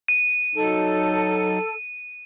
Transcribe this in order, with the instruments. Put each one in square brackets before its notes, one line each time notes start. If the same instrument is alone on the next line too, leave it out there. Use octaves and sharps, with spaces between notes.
[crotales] D#7
[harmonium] F#3 D#4 [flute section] A4